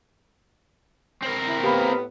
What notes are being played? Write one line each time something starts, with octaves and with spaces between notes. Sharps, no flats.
C4 A#4
E4
A2 A#3 B3 G4 B5